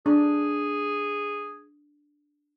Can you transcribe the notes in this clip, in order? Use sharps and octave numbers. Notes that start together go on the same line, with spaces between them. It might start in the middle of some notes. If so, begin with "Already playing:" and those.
D4 G#4